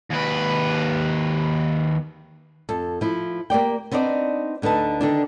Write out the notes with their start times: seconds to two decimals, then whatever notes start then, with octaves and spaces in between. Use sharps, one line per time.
0.11 D#2 B4
2.69 F2 A4
3.01 F3 E4
3.50 A#3 G4 D5 G5
3.91 B3 C4 D4 D#4 D5
4.62 D2 D3 D#4 B4 A5
5.01 D3 D#3 D4